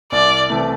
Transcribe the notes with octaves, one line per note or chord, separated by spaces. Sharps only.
C2 D5
C3 E3 A3